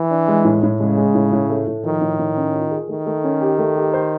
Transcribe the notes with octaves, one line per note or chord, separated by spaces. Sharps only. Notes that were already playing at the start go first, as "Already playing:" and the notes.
Already playing: E3
D4
G#3
A2
A2
C#3 G#3
G#3
A2
A2
A3
A2
D#3 F3
A2
A2
C#4
F4
G#4
D#3 A3
A3
C#4
G4
A3
G4
C5